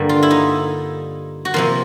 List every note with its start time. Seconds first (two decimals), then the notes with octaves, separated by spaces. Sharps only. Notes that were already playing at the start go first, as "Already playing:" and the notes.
Already playing: G2 D3 G3 A#3
0.09 F4
0.23 E4
0.31 D#4
1.45 F#4
1.54 C3 F3 A#3 F4